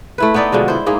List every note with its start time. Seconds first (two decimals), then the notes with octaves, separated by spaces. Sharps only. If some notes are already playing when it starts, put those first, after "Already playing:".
0.18 A3 E4 B4
0.34 B3 D#4 E4 D5
0.52 B2 D3 F3 G#3
0.68 E4 C5
0.86 G#2 A#3 G#4